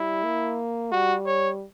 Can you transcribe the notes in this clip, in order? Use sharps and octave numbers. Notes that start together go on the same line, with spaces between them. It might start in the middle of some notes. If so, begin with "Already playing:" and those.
Already playing: G3 E4
A#3
G3 F#4
C#5